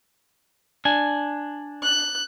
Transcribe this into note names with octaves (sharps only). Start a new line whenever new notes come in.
D4 G#5
F#6